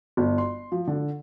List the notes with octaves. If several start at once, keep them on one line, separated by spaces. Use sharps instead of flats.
G1
C6
F3
D3